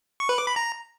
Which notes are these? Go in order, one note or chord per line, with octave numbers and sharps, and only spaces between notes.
C#6
B4
D6
B5
A#5